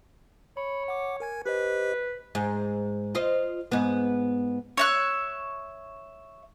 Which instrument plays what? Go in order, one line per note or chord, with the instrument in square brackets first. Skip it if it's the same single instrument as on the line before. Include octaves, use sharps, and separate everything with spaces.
[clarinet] C#5 [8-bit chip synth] B5
[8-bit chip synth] F#5 D6
A#4 G#5 G#6
[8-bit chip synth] G4 C5 D#5 [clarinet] B4
[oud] G#2
F4 C5 D#5
G#2 B3
[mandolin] C#5 E5 F#6